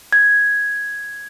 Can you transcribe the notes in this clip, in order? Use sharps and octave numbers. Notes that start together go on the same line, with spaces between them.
G#6